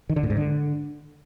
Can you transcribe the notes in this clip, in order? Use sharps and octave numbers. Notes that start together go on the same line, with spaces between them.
D#3
D3
A2
G#2
D3